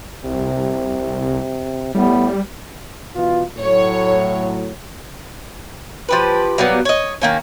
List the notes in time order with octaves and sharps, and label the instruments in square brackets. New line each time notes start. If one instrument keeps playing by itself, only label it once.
[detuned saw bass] C2 [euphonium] C3
[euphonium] A2 [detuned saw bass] G3 [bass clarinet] B3
[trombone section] B2 E3 F4
[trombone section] A2 F#3 [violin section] C#5
[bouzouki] F3 G4 B4
F#3 G3 A#3 B3
C#5 D#5
D#3 A#3 C#4